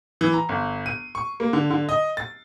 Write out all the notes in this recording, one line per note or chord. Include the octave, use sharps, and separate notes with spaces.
E3
A#5
G1
D#7
C#6
A#3
D3
D3
D#5
A6